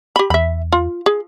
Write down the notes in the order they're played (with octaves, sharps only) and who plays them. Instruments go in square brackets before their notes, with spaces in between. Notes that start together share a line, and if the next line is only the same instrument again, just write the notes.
[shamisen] G4 B5
[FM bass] E2 [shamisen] E5 B5
[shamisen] F4
G#4